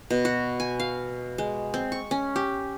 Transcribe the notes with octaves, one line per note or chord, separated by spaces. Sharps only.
B2
F#4
G#5
F5
G#3
C4
C#6
C#4
G4